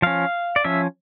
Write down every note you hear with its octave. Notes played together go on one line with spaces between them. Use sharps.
F3 C#4 F5
D5
F3 C#4 E5